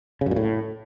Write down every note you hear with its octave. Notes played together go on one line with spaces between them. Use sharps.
C#3
F#2
A#2
A2